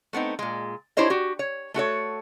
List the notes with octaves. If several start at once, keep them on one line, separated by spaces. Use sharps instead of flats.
A3 B3 C4 D#4
A#2 G#3
D4 E4 G4 C5 C#5 D#5
F#4 G4
C#5
A3 F#4 A4 C#5